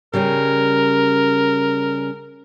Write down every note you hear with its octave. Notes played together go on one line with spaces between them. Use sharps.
C#3 G3 C#4 A#4